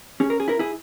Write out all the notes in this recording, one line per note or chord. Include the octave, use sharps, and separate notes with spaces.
C#4 G#4
A#4
G#4
E4 A#4
E4 G#4